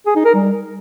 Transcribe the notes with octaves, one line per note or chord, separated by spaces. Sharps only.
G#4
D#4
A#4
G3